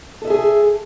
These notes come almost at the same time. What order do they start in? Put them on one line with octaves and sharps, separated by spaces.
A4 D#5 E5 G#4